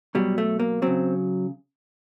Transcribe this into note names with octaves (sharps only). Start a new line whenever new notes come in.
B2 F#3 G3
A3
A#3
C#3 F#3 C4